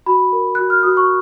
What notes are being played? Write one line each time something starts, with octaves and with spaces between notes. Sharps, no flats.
F#4 B5
A#4
F#4 F#6
F6
F#4 D#6
C#6